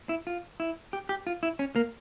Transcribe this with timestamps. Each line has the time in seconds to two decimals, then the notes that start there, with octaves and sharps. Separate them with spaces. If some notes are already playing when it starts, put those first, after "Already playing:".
0.09 E4
0.27 F4
0.60 E4
0.93 G4
1.09 G4
1.27 F4
1.43 E4
1.59 C#4
1.76 A#3